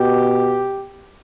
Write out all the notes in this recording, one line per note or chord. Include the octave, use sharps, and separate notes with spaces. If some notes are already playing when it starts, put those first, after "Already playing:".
Already playing: B2 G4